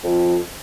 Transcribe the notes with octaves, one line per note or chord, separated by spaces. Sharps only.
F2